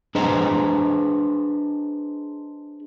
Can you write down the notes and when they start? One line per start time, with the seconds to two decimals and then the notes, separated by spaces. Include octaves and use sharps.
0.15 D4 G#4 B4 C5 D#5 A#5